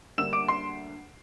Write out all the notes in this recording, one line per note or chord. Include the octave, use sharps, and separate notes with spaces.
D2 D3 G3 A#3 E6 E7
D6 D7
C6 C7